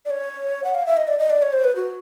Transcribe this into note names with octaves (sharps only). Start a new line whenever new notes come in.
D5
C#5
F#5
F5
E5
D#5
D5
D#5
D5
C#5
C5
B4
F#4